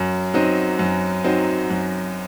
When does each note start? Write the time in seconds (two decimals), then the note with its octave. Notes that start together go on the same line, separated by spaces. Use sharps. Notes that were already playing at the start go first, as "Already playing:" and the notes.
Already playing: F#2
0.34 F#3 C4 D#4
0.79 F#2
1.24 F#3 C4 D#4
1.70 F#2